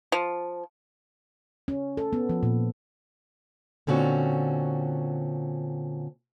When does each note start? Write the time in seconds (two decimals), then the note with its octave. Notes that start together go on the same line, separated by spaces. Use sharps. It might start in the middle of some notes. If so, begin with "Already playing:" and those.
0.12 F3
1.68 C#4
1.97 A4
2.13 B3
2.29 F3
2.43 A#2
3.87 A#2 D3 C4 C#4 F#4